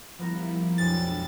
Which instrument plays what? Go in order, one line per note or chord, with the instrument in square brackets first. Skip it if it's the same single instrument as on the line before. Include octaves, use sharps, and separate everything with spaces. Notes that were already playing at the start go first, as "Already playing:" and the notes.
[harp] F3 B3 A#4 [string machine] G3 E4
[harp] B1 F2 G#3 [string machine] D4 [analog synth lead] A6